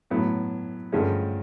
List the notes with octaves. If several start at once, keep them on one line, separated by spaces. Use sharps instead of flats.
A2 F#3 B3
G2 D3 F3 G#3 C#4